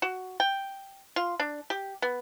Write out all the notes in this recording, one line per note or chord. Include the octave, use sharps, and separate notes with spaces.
F#4
G5
F4
D4
G4
B3